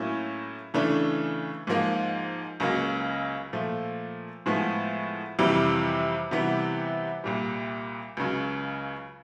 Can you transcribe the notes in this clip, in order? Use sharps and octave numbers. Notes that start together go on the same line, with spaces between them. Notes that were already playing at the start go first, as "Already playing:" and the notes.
Already playing: A2 F#3 A#3 C#4 E4
C#3 E3 A3 D4
G#2 F3 A#3
C#2 C#3 F#3 A#3
A#2 F3 A3
A2 F3 G#3 B3
F2 C3 E3 G3
C3 E3 G3 B3
C2 A#2 G3
C#2 C#3 F#3